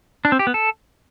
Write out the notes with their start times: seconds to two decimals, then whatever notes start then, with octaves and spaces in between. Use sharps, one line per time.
0.25 D4
0.32 C4
0.39 G4
0.47 B3
0.54 A4